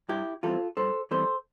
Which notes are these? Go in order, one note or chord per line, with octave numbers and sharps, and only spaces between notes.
G2 E4 G4
E3 G3 C4 F4 A4
G2 A4 C5
E3 G3 C4 A4 C5